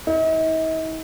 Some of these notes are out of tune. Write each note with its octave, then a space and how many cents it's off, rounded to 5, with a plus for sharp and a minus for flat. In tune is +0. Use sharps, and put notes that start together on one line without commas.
D#4 +45